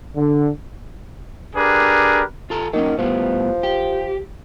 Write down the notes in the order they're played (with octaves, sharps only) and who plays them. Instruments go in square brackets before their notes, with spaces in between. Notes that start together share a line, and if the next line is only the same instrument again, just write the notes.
[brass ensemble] D3
[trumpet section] D4 G4 G#4 A#4 B4
[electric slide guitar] F4 A4 A#5
[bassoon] D#3 [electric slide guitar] F#3 A#3 C#4
[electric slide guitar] A2 G3 B3 [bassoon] F3
[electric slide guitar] G4